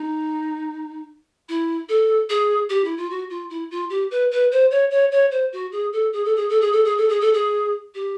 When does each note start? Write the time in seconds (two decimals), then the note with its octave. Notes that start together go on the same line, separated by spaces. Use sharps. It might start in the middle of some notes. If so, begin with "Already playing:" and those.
Already playing: D#4
1.49 E4
1.89 A4
2.30 G#4
2.69 G4
2.85 E4
2.98 F4
3.10 F#4
3.30 F4
3.50 E4
3.71 F4
3.90 G4
4.11 B4
4.31 B4
4.52 C5
4.71 C#5
4.91 C#5
5.12 C#5
5.31 C5
5.53 F#4
5.72 G#4
5.93 A4
6.13 G#4
6.25 A4
6.36 G#4
6.49 A4
6.61 G#4
6.72 A4
6.85 G#4
6.98 A4
7.09 G#4
7.21 A4
7.34 G#4
7.95 G4